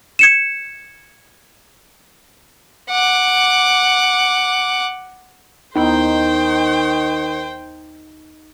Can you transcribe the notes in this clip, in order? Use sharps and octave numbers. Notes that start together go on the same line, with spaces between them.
G#6 C#7 E7
F#5 D6
D#2 D#3 B3 D#4 E4 C5 G5